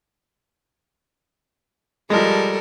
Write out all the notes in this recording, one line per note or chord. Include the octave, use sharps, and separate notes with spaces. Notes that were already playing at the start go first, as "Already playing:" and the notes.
F3 G3 G#3 A4 A#4